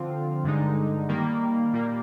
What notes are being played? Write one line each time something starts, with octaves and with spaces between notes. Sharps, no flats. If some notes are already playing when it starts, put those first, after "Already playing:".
Already playing: D3 F3 C4 F4
G2 D3 G#3 D#4
D#3 G3 A#3
A#2 G3 A#3